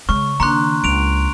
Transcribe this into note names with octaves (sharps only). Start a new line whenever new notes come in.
C#3 G#3 C#6
D#3 A#3 D4 A#5 C6 F#6
C#2 D7 F7